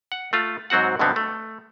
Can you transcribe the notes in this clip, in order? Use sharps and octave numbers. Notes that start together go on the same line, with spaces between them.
F#5
A3 F4
G#2 F#3 C4 F#4 F#5
G2 B2 D3 F#3 B3 C4
A3